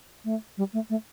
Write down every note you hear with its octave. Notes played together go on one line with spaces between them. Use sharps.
A3
G3
A3
A3